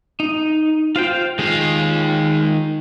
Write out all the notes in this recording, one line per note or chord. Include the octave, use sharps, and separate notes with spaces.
D#4
F4 C5 G5
D#3 G#3 F4 F5